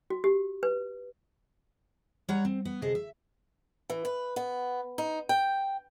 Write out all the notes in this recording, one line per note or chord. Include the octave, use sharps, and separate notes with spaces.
F#4
G4
B4
G3 C#5 F#5 A#5
C4
B3
D2 C3 G#4 A4 D#5
E5
E3
B4
B3
D#4
G5